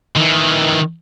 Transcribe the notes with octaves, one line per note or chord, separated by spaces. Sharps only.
D#3 E3